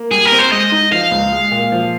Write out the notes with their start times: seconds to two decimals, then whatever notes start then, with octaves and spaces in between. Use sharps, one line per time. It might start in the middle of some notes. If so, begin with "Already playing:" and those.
Already playing: A#3
0.11 G3 G#4
0.25 A#4
0.32 C4
0.39 C5
0.52 G#3 D#5
0.72 D#4
0.92 F3 F5
1.11 C#2
1.32 G#3
1.52 A#2
1.72 F3